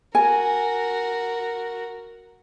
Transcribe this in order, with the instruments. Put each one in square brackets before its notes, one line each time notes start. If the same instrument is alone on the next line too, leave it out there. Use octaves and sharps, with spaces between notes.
[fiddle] F#4 A#4 [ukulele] G#5